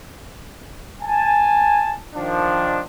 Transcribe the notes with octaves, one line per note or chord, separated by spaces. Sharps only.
G#5 A5
D#3 F3 D4